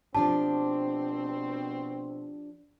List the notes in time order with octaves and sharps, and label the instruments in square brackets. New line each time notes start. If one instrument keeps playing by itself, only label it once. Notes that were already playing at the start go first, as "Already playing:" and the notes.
[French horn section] B2 C4 [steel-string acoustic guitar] F3 D4 G4 [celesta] A5